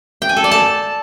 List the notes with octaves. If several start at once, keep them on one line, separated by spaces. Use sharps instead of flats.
G5
G#5
A4
D5
A5